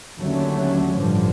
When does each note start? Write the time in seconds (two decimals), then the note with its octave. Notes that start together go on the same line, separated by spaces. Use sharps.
0.18 D#2 D3 F#3 A3 C#4
0.95 A1 G2 D3 F3